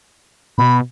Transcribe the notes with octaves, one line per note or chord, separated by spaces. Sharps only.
B2 B5